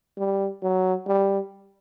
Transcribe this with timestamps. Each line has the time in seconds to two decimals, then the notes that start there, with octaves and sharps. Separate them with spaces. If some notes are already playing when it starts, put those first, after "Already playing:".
0.17 G3
0.62 F#3
1.07 G3